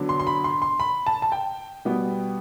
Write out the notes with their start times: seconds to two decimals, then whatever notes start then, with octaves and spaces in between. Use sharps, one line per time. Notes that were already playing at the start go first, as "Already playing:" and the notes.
Already playing: D3 F#3 B3
0.09 C6
0.20 C6
0.27 B5
0.44 C6
0.62 C6
0.80 B5
1.07 A5
1.22 A5
1.32 G5
1.85 B2 G3 B3